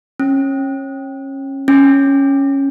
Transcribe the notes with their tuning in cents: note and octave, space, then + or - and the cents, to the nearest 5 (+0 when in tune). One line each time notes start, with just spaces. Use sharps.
C#4 -25
C#4 -5